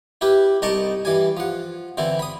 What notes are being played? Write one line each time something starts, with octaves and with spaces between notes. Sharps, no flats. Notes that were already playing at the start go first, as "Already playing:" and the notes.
E4 G4 B4
C2 D#4 D#5 A5 C#6 D6
E3 G3 G#5
F3 F#5
D3 E3 C4 E4
B5 D#6